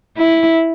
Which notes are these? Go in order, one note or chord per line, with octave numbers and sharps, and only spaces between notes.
E4